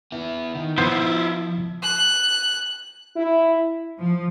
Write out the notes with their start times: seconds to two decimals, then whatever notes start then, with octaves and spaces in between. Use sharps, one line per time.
0.12 B3 E4
0.55 D#3
0.78 F3 B3 E4 F4 C5
1.83 F#6
3.16 E4
3.98 F3